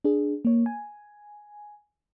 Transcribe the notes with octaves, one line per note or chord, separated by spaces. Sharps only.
D4 G#4
A#3 C#5
G#5